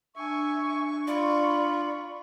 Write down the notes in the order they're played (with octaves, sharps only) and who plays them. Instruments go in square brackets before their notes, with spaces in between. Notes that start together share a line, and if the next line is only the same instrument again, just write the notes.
[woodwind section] D4 C#6 [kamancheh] E5 G#5
[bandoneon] F4 [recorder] D5 [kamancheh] B5